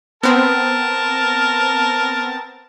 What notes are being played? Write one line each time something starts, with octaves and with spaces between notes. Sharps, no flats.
B3 C4 A#4 A5